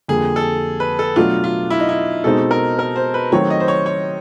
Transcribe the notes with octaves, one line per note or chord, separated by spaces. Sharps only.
F2 D3 G3 A#3 G#4
A4
B4
A4
B2 F#3 A3 D4 F4 F#4
F4
E4
D#4
E4
B2 G#3 C4 D#4 A4
A#4
A#4
C5
B4
D#3 F#3 A3 C4 C#5
D#5
C5
C#5
C#5